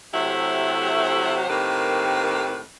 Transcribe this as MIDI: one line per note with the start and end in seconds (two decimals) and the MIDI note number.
0.14 1.43 48
0.14 1.43 54
0.14 1.43 57
0.14 1.43 64
0.14 1.43 67
0.14 1.43 72
1.49 2.61 45
1.49 2.61 51
1.49 2.61 58
1.49 2.61 60
1.49 2.61 67
1.49 2.61 71